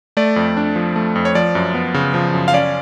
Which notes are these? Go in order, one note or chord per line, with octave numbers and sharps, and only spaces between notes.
A3 D5
F2
D4
F3
A3
F2
C#5
F3 D5
F#2
B3
C#3
F3
F#2
F5
C#4 D5